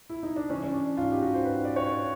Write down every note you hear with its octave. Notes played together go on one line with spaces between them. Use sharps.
E4
D#4
D4
E3 C#4
C#4
D4
G#2 F4
G4
F#4
C5
G#2 B4
D5
C#5